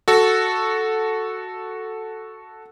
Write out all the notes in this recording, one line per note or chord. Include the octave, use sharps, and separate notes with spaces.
F#4 A4